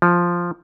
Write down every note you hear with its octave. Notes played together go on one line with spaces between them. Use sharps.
F3